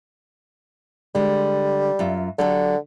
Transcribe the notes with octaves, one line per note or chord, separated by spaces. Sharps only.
D3 G3 G#3
F#2 F4 E5
D3 F#3 G4 A4